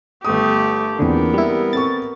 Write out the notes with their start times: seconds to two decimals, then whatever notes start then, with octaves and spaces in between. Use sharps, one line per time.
0.24 G1 A3 G4 D#6
0.99 E2 A#2 D3 G#3 B3 C4 A#4
1.34 G3 E4
1.73 C4 A4 C#6 A6